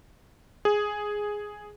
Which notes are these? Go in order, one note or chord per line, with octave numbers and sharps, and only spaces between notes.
G#4